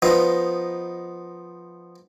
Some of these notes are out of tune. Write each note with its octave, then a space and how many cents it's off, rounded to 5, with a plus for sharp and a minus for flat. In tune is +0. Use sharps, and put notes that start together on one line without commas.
F3 +0 B3 +0 D#4 +0